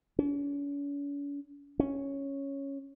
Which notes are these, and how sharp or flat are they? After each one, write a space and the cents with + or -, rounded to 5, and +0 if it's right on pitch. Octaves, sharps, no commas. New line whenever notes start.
C#4 +45
C#4 -5